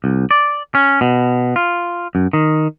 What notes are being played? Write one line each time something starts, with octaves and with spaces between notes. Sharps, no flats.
C2
D5
C#4
B2
F4
F#2
D#3